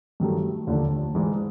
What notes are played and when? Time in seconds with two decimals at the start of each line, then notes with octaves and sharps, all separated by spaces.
0.20 G2 D#3 F#3 A3
0.67 D#2 D3 F3 A3 D4
1.15 G#2 E3 G#3